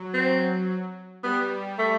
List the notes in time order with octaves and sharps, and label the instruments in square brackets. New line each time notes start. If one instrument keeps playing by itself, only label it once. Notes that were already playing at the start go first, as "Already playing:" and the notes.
Already playing: [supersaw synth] F#3
[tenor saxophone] C4
[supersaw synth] G3 [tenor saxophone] B3
[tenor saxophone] A3